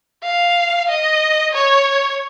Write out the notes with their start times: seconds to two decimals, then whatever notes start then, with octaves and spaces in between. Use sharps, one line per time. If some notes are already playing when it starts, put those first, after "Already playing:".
0.24 F5
0.89 D#5
1.53 C#5